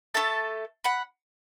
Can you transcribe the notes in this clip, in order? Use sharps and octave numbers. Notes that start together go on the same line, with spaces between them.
A3 E4 A4 E5 A5
F#5 B5